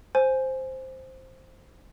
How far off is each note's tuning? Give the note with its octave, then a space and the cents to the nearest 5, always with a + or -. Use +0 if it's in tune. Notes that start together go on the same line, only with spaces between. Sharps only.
C5 +0 G#5 +0